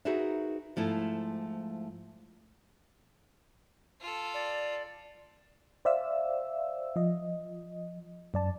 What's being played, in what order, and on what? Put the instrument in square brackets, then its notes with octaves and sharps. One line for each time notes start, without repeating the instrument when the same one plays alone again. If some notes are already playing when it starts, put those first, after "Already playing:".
[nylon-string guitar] D#4 F#4 G#4 A#4 B4 E5
G#2 F3 A3 E4
[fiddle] F4 A4
[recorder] D5
[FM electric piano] C5 D5 E5 F5 E6
F3 D#5
F#2 D5 A5